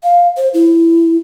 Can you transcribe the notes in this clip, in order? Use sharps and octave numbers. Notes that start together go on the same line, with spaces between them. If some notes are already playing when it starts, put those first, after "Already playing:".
F5
C5
E4